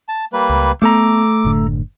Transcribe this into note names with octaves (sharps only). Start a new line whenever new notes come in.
A5
G3 A#3 B4
C#2
A3 B3 A4 A#5 D6
F#1 A2 D3